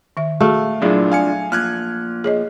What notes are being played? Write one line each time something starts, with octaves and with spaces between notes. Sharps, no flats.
D#3 E5
A3 F#4 G#4 F5
C2 A#2 F#3 D4 E4 F4 G#4
F5 G#5 C#7
A#2 F3 F6 F#6 G#6
G#4 C#5 D#5